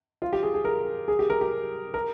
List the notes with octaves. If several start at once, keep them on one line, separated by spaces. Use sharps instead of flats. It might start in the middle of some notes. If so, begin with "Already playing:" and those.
F4
G4
G#4
G#4
A#4
G#4
G4
A#4
G4
A#4